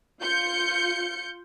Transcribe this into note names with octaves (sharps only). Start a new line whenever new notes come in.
F4 G6 C#7